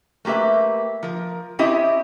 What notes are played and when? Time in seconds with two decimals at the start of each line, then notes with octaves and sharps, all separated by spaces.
0.25 A3 A#3 G4 B4 E5
1.03 F3 A#4
1.59 C4 C#4 E4 G4 D#5 E5